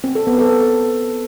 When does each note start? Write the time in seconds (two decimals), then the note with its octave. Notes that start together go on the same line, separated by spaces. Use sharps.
0.04 C4
0.15 A4
0.27 B3
0.38 A4